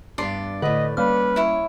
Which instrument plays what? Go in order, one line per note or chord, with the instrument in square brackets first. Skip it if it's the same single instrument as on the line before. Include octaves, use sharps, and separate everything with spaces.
[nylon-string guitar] G2 B3 D4 [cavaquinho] D5 C6
[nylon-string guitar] A2 B4 [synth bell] D3 [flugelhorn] D#5
[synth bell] G3 A#3 F6 [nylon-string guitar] C#4 [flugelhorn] B4
[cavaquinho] E4 C#5